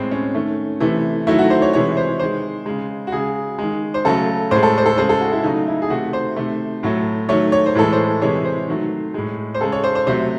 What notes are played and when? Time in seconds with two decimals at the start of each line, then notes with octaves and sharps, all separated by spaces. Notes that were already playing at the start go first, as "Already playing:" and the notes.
Already playing: A2 G#3 C4
0.11 C#4
0.34 D#3 A3
0.80 C3 E3 A3
1.27 D#3 F#3 A3 E4
1.39 F#4
1.50 C5
1.62 C#5
1.73 C3 E3 G#3 C#5
1.97 C5
2.19 D#3 G#3 C5
2.66 C#3 G#3
3.07 F#4
3.12 C#3 G#3 G#4
3.58 D#3 G#3
3.94 C5
4.05 C#3 F#3 A3 A4
4.51 A2 G#3 C5
4.63 A4
4.78 C5
4.86 A4
4.97 C#3 G#3 C5
5.09 A4
5.21 F#4
5.32 E4
5.43 C#3 F#3 A3 D#4
5.67 E4
5.82 G#4
5.90 C3 D#3 A3 F#4
6.13 C5
6.36 C3 D#3 A3
6.83 A2 F#3 A3
7.29 D#3 F#3 A3 C#5
7.52 C#5
7.66 C5
7.75 A2 E3 G#3 A4
7.93 C5
8.21 C3 E3 G#3 C#5
8.45 C5
8.68 D#3 F#3 A3
9.14 A2 G#3
9.54 C5
9.61 C#3 G#3 A4
9.72 C#5
9.84 C5
9.95 C5
10.07 C3 F#3 A3 C5